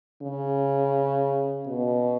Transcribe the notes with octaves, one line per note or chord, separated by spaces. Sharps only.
C#3
B2